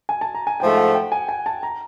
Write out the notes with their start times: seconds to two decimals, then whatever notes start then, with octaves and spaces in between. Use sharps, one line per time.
0.09 G#5
0.21 A5
0.35 A#5
0.47 G#5
0.60 G#2 F3 A3 G5
0.77 F#5
0.94 G5
1.12 G#5
1.29 G#5
1.46 A5
1.63 A#5